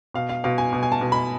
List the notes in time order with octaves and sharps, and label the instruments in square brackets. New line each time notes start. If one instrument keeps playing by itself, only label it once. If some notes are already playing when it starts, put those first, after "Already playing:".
[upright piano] B2 F5
F5
B2 F5
G#5
B2
G#5
A5
B2
B5